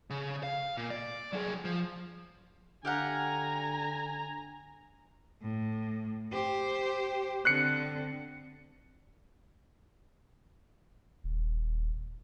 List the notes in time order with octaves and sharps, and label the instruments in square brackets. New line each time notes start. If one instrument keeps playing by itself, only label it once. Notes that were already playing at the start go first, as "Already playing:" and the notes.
[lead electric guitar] C#3
F5
A#2
D5
F#3 G#4
F3
[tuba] D3 [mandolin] G4 F5 F#5 [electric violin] G#5 A#5
[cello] A2
G4 C5
[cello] D3 C4 [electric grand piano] F#6 C7 C#7
[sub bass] D#1